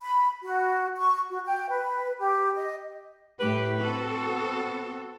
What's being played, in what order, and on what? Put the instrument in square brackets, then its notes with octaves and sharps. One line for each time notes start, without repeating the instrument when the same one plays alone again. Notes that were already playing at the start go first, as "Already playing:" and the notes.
[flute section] B5
F#4
C#6
F#4
G5
B4
G4
D#5
[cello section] A2 G4 [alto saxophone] B4
[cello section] C4 F#4 A4
[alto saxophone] B3